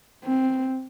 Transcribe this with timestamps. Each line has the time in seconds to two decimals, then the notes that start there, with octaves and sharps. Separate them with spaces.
0.25 C4